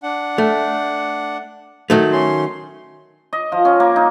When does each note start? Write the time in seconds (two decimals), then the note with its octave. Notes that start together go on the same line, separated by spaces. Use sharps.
0.03 D4 F#5
0.38 A3
1.90 D#3 F#3 A3
2.13 C#4 C6
3.33 D#5
3.52 F3
3.65 C#4
3.80 A#3
3.96 D#4